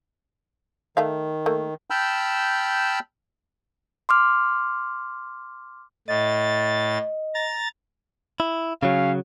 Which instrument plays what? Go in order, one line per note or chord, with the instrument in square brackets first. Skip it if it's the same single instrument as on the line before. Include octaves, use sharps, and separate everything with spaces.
[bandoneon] D#3 [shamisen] A3 E5 F5
[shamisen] A3 A#3
[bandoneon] G5 A5 B5 E6 F6 G6
[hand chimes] C6 D6 F6
[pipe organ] A2 A6 [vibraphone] D#5
[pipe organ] A#5 A6
[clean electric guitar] E4
[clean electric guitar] C#3 F#3 [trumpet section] C#4 F5